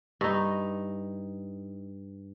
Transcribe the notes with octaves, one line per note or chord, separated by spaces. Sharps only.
G2 D#4